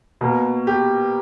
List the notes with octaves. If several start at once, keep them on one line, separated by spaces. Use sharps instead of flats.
B2 A#3
G4